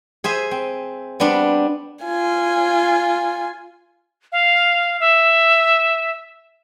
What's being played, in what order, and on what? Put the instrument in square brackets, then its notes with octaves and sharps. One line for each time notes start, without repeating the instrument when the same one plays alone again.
[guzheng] G#4 C5 E5 G#5
C4
G3 B3 C4 D4
[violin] F4 G#5
[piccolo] F5
E5